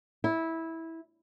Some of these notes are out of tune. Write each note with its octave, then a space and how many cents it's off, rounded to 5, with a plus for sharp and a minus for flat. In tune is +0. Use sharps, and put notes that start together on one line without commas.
E4 -15